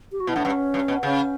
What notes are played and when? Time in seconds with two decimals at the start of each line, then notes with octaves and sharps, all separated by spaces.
0.12 G4
0.20 F#4
0.27 B2 E4
0.36 A2 D4
0.45 G2 C#4
0.74 G2
0.88 B2
1.03 C#3 C#4